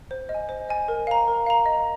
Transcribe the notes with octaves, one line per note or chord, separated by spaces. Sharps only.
C5
D#5
G#5
C5
D#5 G#5
A#4
F5 A#5
A#4
F5 A#5
D#5